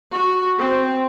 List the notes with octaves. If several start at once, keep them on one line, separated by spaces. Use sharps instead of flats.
F#4
C4